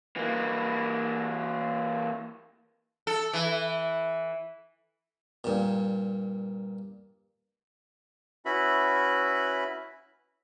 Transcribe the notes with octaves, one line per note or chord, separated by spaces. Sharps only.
E3 A#3
A4
E3
G2 A#2
C#4 E4 F#4 B4 E5 B5